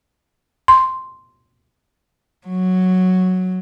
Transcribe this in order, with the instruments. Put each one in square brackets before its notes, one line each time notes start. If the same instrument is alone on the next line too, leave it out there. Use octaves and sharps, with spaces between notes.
[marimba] C6
[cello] F#3